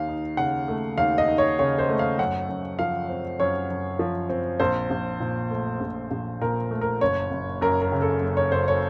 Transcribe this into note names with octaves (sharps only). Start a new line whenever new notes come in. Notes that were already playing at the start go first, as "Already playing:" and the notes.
Already playing: D#2 F5
D#4
C#3 F#5
A3
D#2 F5
D#5
D#4
C#5
C#3 C#5
C5
A3
F5
F#2 F#5
F#2
F3 F5
C4
F#2 C#5
F#2
F3
C4
A#1 C5
A#1
A#2
A3
A#1
A#1
A#2 A#4
A3
A#4
F#1 C#5
F#1
F#2 A#4
A#4
C#3
A4
F#1
C#5
F#1 C5
C#5